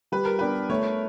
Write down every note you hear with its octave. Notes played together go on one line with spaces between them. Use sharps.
G3 B4
A#4
B3 D4 G4 B4
A3 C#5